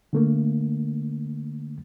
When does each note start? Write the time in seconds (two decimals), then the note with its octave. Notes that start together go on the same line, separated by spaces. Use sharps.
0.13 D3 A3 A#3